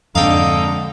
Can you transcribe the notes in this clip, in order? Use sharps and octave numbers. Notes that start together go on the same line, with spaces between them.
F2 G#2 D3 A4 D#5 F5 G5 A#5